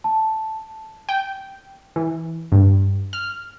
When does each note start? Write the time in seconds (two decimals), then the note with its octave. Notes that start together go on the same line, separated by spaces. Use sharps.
0.04 A5
1.09 G5
1.96 E3
2.52 G2
3.13 F6